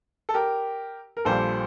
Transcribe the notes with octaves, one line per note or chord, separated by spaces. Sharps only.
A4
G4 A#4
A#4
A#1 A#2 G3 A4 C5